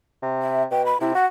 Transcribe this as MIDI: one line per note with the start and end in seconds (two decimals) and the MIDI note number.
0.22 0.65 48
0.42 0.63 76
0.71 0.93 47
0.71 0.84 79
0.86 0.97 83
1.01 1.11 48
1.01 1.13 64
1.15 1.26 66
1.15 1.25 78